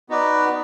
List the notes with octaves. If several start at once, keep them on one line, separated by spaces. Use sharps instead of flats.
B3 D#4 F#4 B4 D5